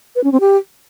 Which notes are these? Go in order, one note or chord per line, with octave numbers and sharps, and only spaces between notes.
B4
C#4
C4
G4